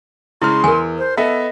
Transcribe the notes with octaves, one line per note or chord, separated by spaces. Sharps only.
C#3 G#3 E4 C6 F6
E2 A#4 G#5
C5
B3 A4 D#5 E5